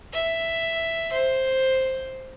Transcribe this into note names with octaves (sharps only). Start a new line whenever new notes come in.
E5
C5